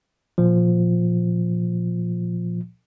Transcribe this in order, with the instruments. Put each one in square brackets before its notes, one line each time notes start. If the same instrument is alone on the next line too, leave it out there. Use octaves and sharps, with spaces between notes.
[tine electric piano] A#2 F3